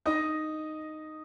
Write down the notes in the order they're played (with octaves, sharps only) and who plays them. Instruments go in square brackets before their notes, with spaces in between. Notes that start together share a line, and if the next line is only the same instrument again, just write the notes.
[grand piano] D#4 D#5